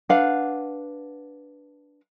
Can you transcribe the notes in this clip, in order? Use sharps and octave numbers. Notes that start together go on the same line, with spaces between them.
D4 B4 F5 F#5